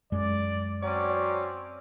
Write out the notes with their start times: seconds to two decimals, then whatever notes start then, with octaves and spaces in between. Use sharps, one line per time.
0.12 F#2 G#3 D5
0.83 F#3 C4 C#4 D5